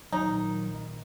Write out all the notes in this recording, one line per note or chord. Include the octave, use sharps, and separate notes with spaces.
A#1 D#3 F#3 D#4